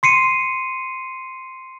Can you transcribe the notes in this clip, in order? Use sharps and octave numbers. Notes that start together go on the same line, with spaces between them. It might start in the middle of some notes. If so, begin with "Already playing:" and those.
C6 C7 C#7 D#7